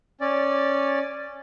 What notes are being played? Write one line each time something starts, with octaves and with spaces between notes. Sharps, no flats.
C#4 D5